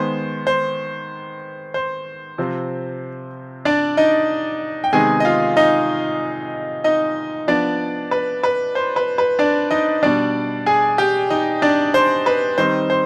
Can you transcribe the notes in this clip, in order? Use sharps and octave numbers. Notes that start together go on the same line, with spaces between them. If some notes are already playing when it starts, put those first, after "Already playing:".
Already playing: D#3 G#3 B3 C5
C5
C5
C3 F3 C4
D4 D5
D#4 D#5
G5
C3 D#3 G#3 B3 D#4 G#4 G#5
D#5
F4 F5
D#4 D#5
D#4 D#5
F3 B3 D4 D5
B4
B4
C5
B4
B4
D4 D5
D#4 D#5
B2 G3 D4 D5
G#4 G#5
G4 G5
D#4 D#5
D4 D5
C5
B4
D#3 G3 C4 D#4 C5
C5